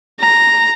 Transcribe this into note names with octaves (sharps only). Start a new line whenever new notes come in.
A#5